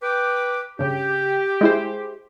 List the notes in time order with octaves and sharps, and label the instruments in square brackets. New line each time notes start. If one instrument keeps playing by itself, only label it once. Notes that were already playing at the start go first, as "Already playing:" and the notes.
[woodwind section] B4 G5 D6
[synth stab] G2 C#3 [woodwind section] G4
[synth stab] G#3 E4 C5